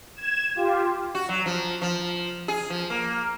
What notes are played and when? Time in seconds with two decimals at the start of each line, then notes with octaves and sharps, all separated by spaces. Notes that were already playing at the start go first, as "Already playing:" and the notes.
0.16 G#6 E7
0.55 F4 G4
1.15 F#4
1.29 F#3
1.46 F3
1.82 F3
2.48 G#4
2.70 F3
2.90 A#3